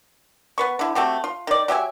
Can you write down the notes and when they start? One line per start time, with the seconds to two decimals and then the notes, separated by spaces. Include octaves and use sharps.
0.58 B3 B4 C#6
0.79 D3 E4
0.95 A3 C4 F#4 G4
1.24 F4
1.47 D#3 D5
1.68 F#3 G4 E5 G#5